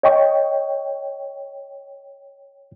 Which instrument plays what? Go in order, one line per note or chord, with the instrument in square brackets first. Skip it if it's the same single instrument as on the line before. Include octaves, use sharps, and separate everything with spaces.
[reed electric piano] C#5 D#5 G5 C#6